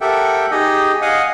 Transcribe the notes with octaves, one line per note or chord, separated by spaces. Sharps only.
G4 A4 A#4 E5 F#5 G5
D#4 G4 G#4 D#5
D#5 F5 F#5 G#5